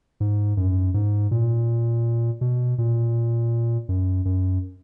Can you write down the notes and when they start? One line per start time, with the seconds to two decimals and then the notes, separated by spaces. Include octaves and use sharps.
0.20 G#2
0.57 F#2
0.94 G#2
1.31 A#2
2.41 B2
2.78 A#2
3.89 F#2
4.25 F#2